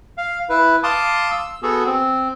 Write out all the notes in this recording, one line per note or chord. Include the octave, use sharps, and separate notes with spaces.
F5
E4 B4
F5 A5 C6 D6 D#6
E6
B3 F#4 G#4 A4
C4